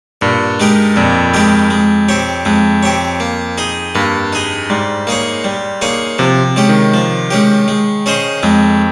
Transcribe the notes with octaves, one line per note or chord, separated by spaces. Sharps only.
G2 A#2
G#3 D#4 G4 A#4
F2 A#2
G#3 D#4 G4 A#4
G#3
C4 G4 C#5
F2 G#3
C4 G4 C#5
A#3
D#4 G#4 D#5
G2 A#3
D#4 G#4 D#5
G#2 G3
A#3 D#4 G#4 C#5
G3
A#3 D#4 G#4 C#5
C3 F3
C3
G#3 C#4 G4
D#3
F3
G#3 C#4 G4
G#3
C#4 G#4 C5 D#5
F2 G#3